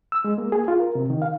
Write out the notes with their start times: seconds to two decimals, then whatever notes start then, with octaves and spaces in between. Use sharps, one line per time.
0.12 E6
0.24 G#3
0.38 A#3
0.52 G#4
0.68 F4
0.80 A#4
0.95 C3
1.10 D#3
1.22 F5